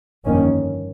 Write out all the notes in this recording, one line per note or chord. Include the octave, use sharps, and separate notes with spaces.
G1 F2 D#3 A#3 C#4